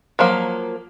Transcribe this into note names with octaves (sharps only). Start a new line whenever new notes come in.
F3 F#3 A#3